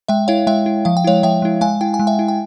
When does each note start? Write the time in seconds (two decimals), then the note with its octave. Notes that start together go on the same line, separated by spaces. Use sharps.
0.08 G#3 E5 G5
0.28 E4 C#5 F5
0.47 G#3 E5 G5
0.66 E4
0.85 F3 F5
0.97 G5
1.04 G#3 E4 C#5 F5
1.23 F3 E5 G5
1.42 G#3 E4
1.61 G#3 F5 G#5
1.81 E4 G5
1.94 G#5
1.99 G#3
2.07 E5 G5
2.19 E4
2.28 G5